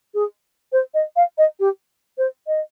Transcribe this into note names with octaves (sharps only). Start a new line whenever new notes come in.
G#4
C5
D#5
F5
D#5
G4
C5
D#5